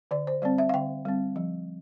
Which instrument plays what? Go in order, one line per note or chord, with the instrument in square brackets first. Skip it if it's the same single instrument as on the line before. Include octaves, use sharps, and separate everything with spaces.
[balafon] D3 D5
C5
G3 C4 D5
E5
F5
D3 G5
G3 C4
F3